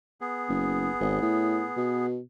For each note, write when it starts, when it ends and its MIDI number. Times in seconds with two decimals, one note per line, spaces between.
0.21 2.07 59
0.21 2.07 68
0.49 0.89 30
1.00 1.18 32
1.22 1.64 45
1.77 2.19 47